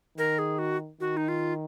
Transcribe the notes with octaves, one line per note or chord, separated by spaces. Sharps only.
D#3 A#4
G#4
F#4
D#3 F#4
D#4
F4